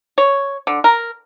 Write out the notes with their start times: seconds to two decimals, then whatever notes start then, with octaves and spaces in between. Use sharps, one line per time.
0.18 C#5
0.67 D3
0.84 A#4